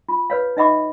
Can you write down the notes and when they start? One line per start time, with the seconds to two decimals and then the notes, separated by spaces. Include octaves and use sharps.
0.09 F4
0.30 B4 C#5 F5
0.57 D#4 D#5 E5 F#5 B5 D6